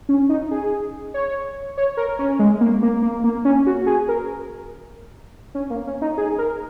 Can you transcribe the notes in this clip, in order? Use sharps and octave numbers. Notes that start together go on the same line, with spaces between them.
C#4
D#4
G#4
C#5
C#5
A#4
C#4
G#3
A#3
A#3
A#3
A#3
C#4
F#4
G#4
A#4
C#4
A#3
C#4
D#4
G#4
A#4